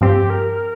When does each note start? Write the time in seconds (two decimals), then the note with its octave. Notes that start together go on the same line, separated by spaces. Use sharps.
0.01 G2 F3 C4 G4
0.30 A#4